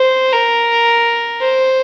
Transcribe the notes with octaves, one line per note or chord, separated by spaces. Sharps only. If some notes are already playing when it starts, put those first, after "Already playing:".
Already playing: C5
A#4
C5